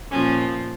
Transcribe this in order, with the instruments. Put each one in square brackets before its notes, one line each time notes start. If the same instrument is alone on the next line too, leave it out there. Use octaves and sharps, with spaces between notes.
[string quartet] A#2 F3 C#4